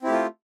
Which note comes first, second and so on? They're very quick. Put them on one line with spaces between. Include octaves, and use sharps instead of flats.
C4 E4 G4 A3 F4